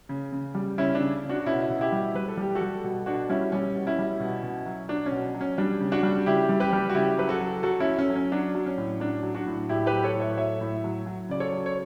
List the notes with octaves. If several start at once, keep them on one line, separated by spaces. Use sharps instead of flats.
C#3
C#3
G3
C#3 C#4 E4
D4
C#3
C#3
D4 F#4
F#4
B2 C#4 E4
B2
E4 G4
G3
G3 B4
A4
G3 G4
F#4 A4
G3
B2
B2 D4 F#4
G3 C#4 E4
G3 C#4
B2
C#4 E4
G3
B2
B2
F#3
F#3 D4
C#4
B2
F#3
C#4
G3 D4
C#3
D4 F#4
G3
C#3 E4 G4
G3
G4 B4
G3
F#4
C#3 E4 G4
F#3 B4
F#4 A4
F#3
F#3 F#4 A4
C#4 E4
F#3
C#4
F#3
C#4
F#3 D4
F#3
C#4
A2
F#3 D4
F#3
D4 F#4
A2
A2 E4 G4
G4 B4
F#3
A4 C#5
A2
C#5 E5
F#3 C#5 E5
A2
F#3
F#3
C#3 D5
A4 C#5
F#3
C#5